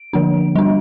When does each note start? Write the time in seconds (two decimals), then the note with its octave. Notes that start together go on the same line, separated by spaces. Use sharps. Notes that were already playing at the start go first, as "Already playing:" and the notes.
Already playing: D7
0.13 D3 F3 A#3 D4
0.56 G3 D4